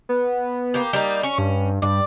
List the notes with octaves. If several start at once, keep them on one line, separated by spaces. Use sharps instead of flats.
B3
A#3 G4
G3 A#3 D#4
C#4 C#6
G2
G2 D5